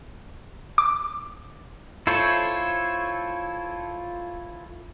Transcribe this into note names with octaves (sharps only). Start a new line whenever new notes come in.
D6
E4 F4 A4 C5 C#5